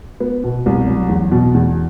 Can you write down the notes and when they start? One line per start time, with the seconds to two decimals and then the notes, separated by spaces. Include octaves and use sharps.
0.20 B3
0.44 B2
0.66 C2
0.87 F#3
1.09 E2
1.32 B2
1.54 E2